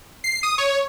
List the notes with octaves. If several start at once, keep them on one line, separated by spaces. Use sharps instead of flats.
C7
D#6
C#5